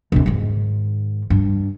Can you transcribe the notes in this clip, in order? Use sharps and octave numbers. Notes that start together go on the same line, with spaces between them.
E1 C3
G#2 D#3
G2